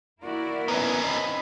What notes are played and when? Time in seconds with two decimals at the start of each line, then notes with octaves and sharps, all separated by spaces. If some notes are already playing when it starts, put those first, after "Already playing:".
0.23 A#3 E4 F#4 A#4 D5
0.68 B3 C#4 D#4
1.03 C4 D#5 B5